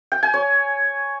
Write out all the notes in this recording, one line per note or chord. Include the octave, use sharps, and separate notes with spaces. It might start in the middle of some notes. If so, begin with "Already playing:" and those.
G5
G#5
C#5